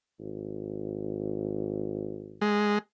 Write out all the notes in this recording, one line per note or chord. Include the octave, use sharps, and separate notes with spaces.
G#1
G#3